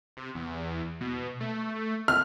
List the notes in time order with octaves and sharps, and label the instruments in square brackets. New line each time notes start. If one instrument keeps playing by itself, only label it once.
[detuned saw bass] C3
E2
B2
A3
[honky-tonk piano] F6